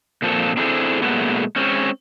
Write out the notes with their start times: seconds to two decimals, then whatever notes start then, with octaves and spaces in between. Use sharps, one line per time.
0.22 A#2 F3 C4 A4
0.57 C4 D4 E4 G#4 A4 C5
1.02 A#2 D#3 F#3 G#3 A3 B3
1.56 G#3 C4 C#4